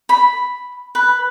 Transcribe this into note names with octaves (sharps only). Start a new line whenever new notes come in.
B5
B4